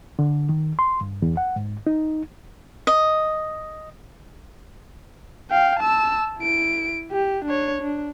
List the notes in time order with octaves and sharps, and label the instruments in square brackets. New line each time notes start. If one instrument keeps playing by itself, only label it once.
[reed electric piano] D3
D#3
C6
G2
E2
F#5
G#2
D#4
[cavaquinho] D#5
[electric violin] F5 G5
A5 E6
E4 D7
G4
D4 C#5
D4